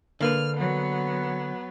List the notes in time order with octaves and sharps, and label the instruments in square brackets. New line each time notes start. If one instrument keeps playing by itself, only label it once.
[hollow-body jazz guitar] D3 A#3 B4 [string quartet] F6
[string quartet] F#3 B3